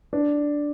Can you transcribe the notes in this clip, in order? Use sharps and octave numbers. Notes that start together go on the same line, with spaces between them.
D4